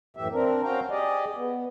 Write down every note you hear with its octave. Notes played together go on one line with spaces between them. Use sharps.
F#2 A2 E3 G4 E5
C4 D4 A#4
C4 C#4 F#4 F5 G5 A#5
G4 G#4 D5 D#5
B3